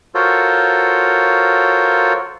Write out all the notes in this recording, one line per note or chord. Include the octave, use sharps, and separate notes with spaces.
F4 F#4 A4 A#4 C5 C#5